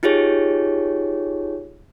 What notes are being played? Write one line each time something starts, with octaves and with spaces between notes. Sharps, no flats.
D#4 F4 G4 G#4 C#5